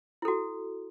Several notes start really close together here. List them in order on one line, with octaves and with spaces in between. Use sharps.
E4 A4 F#4